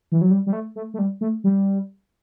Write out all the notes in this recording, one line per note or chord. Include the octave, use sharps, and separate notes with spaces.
E3
F#3
G3
G3
A3
A3
A3
G3
A3
G3